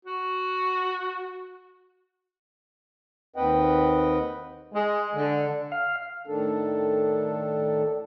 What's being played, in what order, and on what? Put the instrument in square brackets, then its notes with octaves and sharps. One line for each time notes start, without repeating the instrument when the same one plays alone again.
[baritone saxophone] F#4
[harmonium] D#2 C4 B4 D#5 F#5 G5
[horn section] G#3
D3
[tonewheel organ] F5
[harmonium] A2 D#3 D4 A4